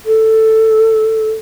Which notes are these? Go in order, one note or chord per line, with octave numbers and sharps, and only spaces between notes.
A4